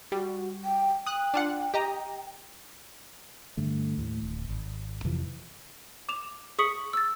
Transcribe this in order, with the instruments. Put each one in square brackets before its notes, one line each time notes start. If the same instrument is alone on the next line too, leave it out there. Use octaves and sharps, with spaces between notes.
[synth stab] G3 [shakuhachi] F#4
[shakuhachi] G5
[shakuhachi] G5 [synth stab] D#6 F#6
[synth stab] D4 F4 F#5
G4 D#5 A#5
[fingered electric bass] G2 D3 A3
D#2 A2
D1
G#1
F2 C3 E3 F3
[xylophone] D6 E7 F7
G#4 C#6 D#6 B6 C#7 F#7
E6 A6